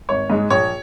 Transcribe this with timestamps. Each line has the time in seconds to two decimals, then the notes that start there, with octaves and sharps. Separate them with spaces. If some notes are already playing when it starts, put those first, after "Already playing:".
0.09 G#1 C#5
0.30 G#2 G#3
0.50 A#1 C#5